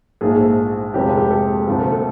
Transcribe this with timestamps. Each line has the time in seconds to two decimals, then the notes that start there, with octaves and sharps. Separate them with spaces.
0.21 A#1 G#2 F3 A3 G#4
0.94 F1 F2 C3 F3 G#3 G4
1.17 G4
1.31 A4
1.67 D2 C3 F3
1.80 A4
1.92 A4